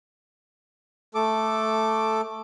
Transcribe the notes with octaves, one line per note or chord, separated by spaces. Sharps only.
A3 A4 D6